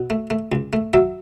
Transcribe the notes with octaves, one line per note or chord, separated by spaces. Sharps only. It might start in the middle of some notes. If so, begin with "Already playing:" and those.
Already playing: B2
A3
A3
C#2
A3
F#3 E5